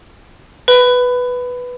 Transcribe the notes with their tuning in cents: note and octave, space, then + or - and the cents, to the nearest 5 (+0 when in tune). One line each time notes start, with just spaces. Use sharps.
B4 +0 B5 +20